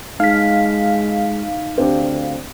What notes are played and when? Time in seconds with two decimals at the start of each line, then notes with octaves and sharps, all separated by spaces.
0.20 G#3 D#4 F5 B6
1.78 D2 C4 D4 G4